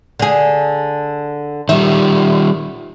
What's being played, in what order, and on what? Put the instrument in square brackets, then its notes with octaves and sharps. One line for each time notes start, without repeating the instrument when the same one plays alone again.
[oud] D3 G#4
[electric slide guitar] D#3 G3 [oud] E5